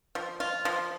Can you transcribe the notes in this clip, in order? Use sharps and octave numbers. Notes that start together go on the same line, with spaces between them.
F3
F4
F3